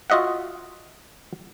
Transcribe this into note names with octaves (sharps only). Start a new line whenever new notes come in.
F4 F#4 D#5 E5 F#5